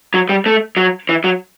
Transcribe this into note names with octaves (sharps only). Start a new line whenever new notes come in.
F#3
G3
A3
F#3
E3
F#3